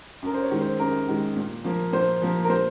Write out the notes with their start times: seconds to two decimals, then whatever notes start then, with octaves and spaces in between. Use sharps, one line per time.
0.22 F#2 A#4
0.34 C5
0.42 C#5
0.51 D#3 G#3
0.61 C5
0.79 F#2 A#4
1.08 D#3 G#3
1.36 A#2
1.64 F3 A#3
1.93 A#2 C5
2.22 F3 A#3
2.44 A#4
2.49 A#2 C5